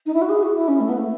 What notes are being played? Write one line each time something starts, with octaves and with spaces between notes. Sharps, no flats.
D#4
E4
F#4
G#4
F#4
E4
C#4
A3
B3
A3